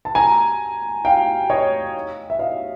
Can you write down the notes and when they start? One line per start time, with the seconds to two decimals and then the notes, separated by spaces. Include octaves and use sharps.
0.05 A5
0.15 G#5 A#5
1.05 F5 G5
1.50 C#5 D#5
2.30 E5
2.39 D#5 F5